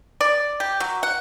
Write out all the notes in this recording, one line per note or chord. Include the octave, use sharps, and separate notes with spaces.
D5
G4
F#3
F#5